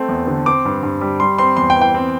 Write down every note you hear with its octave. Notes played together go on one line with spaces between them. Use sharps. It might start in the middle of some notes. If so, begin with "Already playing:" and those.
Already playing: A3 C4
E2
D3
C4 D6
G2
G2
G3
G3 C6
C4 C6
E2 C6
G5
E3
G5
C4